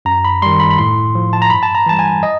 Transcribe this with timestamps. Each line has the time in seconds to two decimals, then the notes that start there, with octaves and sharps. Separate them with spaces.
0.05 F#2 A#5
0.25 B5
0.42 D#3 G3 C6
0.60 B5
0.70 B5
0.78 A2 C6
1.15 F3
1.33 A5
1.42 A#5
1.50 G2 B5
1.63 A5
1.75 A#5
1.86 E3 G3 A5
1.99 G#5
2.23 D#5